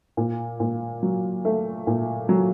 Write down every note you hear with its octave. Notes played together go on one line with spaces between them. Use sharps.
A#2
A#2
F#3
A3
A#2
F#3